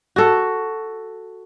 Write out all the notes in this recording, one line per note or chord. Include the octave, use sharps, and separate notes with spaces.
F#4 A4